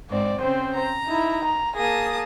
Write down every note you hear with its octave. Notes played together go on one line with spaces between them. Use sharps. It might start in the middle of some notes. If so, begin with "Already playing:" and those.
G#2 C4 D5
C#3 C4 C5
A#5
D#4 E4
A#5
A#3 G#4 A5 D#6 A#6